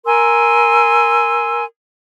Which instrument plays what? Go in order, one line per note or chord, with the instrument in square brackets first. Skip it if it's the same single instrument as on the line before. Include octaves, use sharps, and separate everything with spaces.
[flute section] A#4 G#5 C6 E6